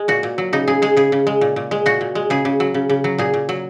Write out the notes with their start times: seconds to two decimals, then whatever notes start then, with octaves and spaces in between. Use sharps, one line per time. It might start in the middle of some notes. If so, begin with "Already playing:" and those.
Already playing: G#3
0.08 A#2 F#4
0.23 A#2
0.38 F#3
0.53 C#3 D#4
0.68 C#3 G#4
0.82 G#3 G#4
0.96 C#3 G#4
1.12 C#3
1.27 G#3
1.41 A#2
1.56 A#2
1.71 G#3
1.86 A#2 F#4
2.01 A#2
2.15 G#3
2.30 C#3 G#4
2.45 C#3
2.60 F#3
2.74 C#3
2.89 C#3
3.04 F#3
3.18 A#2 G#4
3.34 A#2
3.49 F#3